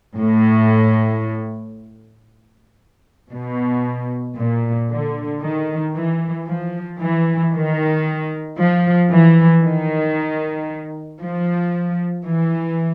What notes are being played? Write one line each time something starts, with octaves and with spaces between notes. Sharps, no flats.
A2
B2
A#2
D3
D#3
E3
F3
E3
D#3
F3
E3
D#3
F3
E3